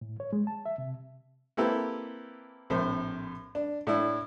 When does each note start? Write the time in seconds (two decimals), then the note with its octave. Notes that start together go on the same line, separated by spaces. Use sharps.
0.01 A2
0.20 C#5
0.33 G#3
0.47 A5
0.66 E5
0.78 C3
1.57 A#3 C4 E4 G4 A4 B4
2.70 A#1 A2 C3 C5
3.55 D4
3.87 A2 D4 E4